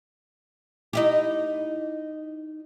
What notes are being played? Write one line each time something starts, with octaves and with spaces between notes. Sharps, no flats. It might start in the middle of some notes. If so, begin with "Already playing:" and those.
D#4 E4 G4